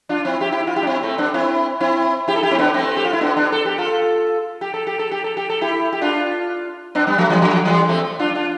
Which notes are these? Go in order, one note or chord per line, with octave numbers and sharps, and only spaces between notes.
D4 F4
C4 E4
E4 G4
E4 G4
F4
E4 G4
D4
C4 E4
A3 C4
B3 D4
C4 E4
C4 E4
E4 G4
A4
E4 G4
C4
B3 D4
A3 C4
G4
F4
E4
B3 D4
B3 D4
A4
G4
F4 A4
G4
A4
G4
A4
G4
A4
G4
A4
E4 G4
G4
D4 F4
B3 D4
G3 B3
F3 A3
E3 G3
D3 F3
E3 G3
A3 C4
D4 F4
D4 F4